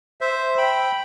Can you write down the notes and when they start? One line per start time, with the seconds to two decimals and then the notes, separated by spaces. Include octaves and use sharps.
0.21 C5 E5
0.58 G5 B5